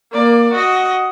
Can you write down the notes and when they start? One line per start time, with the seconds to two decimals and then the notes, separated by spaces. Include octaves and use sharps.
0.12 A#3 D5
0.53 F#4 D#5